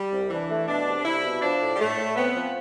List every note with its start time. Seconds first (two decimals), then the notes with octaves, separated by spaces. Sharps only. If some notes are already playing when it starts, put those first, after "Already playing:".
Already playing: G3
0.11 C2
0.30 E3 D4
0.49 A3
0.67 B2 D4
0.87 C2
1.05 C2 E4
1.23 B2
1.42 F3 D4
1.61 A2
1.74 G3
1.79 A2 A3
1.98 A2
2.16 B3 C4
2.35 F3